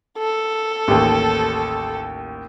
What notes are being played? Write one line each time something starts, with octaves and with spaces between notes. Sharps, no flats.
A4
A1 D#2